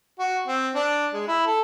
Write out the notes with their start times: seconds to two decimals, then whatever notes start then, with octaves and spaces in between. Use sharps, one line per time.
0.19 F#4
0.47 C4
0.75 D4
1.13 G#3
1.27 E4
1.46 A4